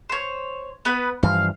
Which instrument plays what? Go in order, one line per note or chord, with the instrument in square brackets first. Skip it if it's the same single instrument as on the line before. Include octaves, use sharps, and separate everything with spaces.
[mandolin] C5 C#5
B3 B4 B5
[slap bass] G2 E3 F3 [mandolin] F5